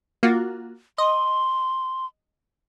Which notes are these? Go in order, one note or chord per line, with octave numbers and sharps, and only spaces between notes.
A#3 F4 F#4
D#5 C6